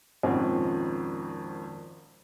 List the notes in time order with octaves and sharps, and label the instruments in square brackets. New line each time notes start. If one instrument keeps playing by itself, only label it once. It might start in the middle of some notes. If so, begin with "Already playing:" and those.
[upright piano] G#1 F2 A#2 C4 C#4 F#5